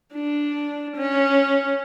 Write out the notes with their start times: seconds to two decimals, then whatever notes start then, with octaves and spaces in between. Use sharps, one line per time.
0.14 D4
0.96 C#4